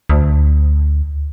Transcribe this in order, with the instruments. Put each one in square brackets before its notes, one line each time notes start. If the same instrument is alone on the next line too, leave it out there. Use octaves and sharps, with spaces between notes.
[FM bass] D2